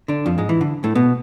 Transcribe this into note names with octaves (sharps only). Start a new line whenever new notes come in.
D3 D4
F2 F3
G#2 G#3
E3
D3
A2 A3
B2 B3